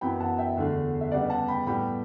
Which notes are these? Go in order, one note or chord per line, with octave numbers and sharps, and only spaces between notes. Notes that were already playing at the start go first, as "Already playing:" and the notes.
F#2 E3 B3 G5 B5
F#5 A5
E5 G5
E2 D3 A3
E5
C#3 G3 B3 D5 F#5
F#5 A5
G5 B5
A2 G3 B3 G5 B5